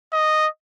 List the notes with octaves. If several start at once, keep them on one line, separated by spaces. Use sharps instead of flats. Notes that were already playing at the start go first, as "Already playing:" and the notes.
D#5